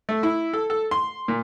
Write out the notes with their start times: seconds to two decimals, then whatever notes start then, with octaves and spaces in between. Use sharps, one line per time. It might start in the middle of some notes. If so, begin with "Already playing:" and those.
0.09 A3
0.23 E4
0.53 A4
0.70 A4
0.91 C6
1.28 A#2